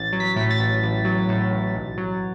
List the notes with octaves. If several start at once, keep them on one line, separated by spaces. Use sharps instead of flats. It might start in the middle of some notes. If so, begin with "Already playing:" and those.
Already playing: A1 A6
F#3
B6
A2
A6
A1
A1
F#3
A2
A1
B1
F#3